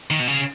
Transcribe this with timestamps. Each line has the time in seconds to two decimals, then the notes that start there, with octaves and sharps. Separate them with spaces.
0.11 D#3
0.19 B2
0.28 C#3